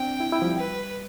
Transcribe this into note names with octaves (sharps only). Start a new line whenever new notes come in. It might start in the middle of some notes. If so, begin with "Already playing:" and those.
Already playing: C4 D4 G5
E4
E4
F3
G3
B4